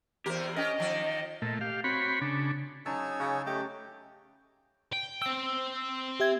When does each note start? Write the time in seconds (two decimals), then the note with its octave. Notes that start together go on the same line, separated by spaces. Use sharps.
0.26 E2 G4 A#4 C5
0.57 C#4 G4 D#5
0.78 D#3 F3 D5
1.42 A#2 A3
1.61 G4 F5
1.84 C4 F#4 C#5 B5
2.21 C#3 D4
2.86 C#3 F#3 D#4 G#5 A5 E6
3.20 C#3 F#4
3.46 A3 G4 D#5
4.93 G5
5.22 C4 G5 E6
6.20 G4 E5 G#6